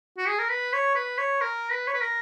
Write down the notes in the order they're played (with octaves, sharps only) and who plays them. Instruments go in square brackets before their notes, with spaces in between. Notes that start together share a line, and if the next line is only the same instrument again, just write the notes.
[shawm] F#4
G#4
A#4
B4
C#5
B4
C#5
A#4
B4
C#5
B4
A#4